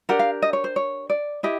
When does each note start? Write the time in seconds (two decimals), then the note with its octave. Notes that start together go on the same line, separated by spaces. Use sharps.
0.09 D4 G4 A#4 F#5
0.19 F5
0.42 D#5
0.53 C#5
0.64 C5
0.76 C#5
1.10 D5
1.43 E4 G4 D#5